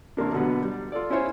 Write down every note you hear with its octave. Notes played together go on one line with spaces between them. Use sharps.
A1 C3 A#3 D4
B2 D3 F#3 B3
G3
F4 A4 D5
C#4 E4 F4 C5 C#5 G#5